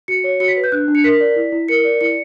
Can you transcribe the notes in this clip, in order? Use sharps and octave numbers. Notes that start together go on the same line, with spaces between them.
F#4 C#7
C#5
F#4 C#7
B6
B4
G6
D4 F#6
D4
C#7
A#4 B6
D5
E4
E4
A#4 C#7
D5
E4 C#7